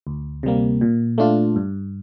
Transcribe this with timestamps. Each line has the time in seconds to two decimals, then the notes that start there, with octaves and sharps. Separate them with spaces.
0.07 D2
0.43 C3 G3 A#3
0.81 A#2
1.18 A3 D4 F4
1.56 G2